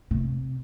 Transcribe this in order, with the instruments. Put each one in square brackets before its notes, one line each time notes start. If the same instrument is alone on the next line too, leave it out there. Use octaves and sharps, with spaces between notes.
[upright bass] C3